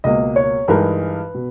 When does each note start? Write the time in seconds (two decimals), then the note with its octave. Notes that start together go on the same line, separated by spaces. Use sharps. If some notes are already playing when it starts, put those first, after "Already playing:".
0.04 C#2 B2 A#3 D#5
0.36 C#5
0.68 G2 E3 G#3 D#4 A#4 B4
1.35 B2